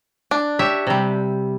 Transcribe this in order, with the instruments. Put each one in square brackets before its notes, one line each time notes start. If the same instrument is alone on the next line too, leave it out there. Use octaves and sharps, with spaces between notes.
[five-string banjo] D4
[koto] G4 C#5 E5
C3 G3